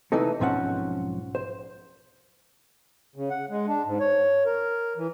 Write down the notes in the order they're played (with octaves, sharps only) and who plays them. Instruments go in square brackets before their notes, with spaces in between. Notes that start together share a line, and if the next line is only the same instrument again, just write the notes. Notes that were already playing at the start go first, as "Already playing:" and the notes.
[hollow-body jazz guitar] C3 E3 A3 C4 D#4 A4
B1 G#2 F3 C4 C#4 F#5
C5
[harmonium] C#3
F#5
G#3
D4
G#2
C#5
A#4
E3